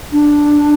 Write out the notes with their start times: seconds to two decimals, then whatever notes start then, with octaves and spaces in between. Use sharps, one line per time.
0.12 D4